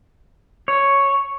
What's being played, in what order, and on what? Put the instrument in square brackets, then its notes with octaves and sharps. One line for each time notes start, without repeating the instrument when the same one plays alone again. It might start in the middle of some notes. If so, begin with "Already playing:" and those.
[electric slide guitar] C#5